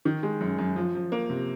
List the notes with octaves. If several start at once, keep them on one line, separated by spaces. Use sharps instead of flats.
D#3
G#3
F#2
F#2
F3
F3
A#3
C3